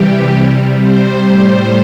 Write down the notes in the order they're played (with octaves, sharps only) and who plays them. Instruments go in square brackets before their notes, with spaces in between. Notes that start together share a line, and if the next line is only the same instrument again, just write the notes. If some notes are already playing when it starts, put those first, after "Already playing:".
Already playing: [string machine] C3 E3 G3 G4
C3 G3
C5
A2 G3 C5